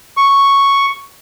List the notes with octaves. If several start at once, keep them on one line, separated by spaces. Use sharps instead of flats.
C#6